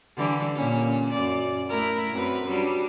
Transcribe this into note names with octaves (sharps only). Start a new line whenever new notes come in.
D3 E3 G3
A#2 A#3 C#4
F#2 D5
A3 E4 A#4
F#2 C4 B4
F#3 G3 D4